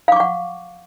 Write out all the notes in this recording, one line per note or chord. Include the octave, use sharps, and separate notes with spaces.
F5 F#5 C#6 D6